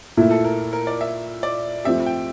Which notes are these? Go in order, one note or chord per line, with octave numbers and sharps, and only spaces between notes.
A#2 A3 E4
A4
A#4
A#4
D5
E5
D5
F3 A3 C4 G4 E5
G5